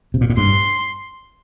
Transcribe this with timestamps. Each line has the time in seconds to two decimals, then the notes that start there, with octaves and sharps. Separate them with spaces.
0.14 C3
0.21 A#2
0.30 A2
0.36 G2 C6